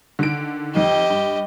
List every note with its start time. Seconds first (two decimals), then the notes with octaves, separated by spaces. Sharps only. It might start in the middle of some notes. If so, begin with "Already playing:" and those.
0.19 D3 D#3 D7
0.75 F2 D#3 G4 D#5
1.10 G2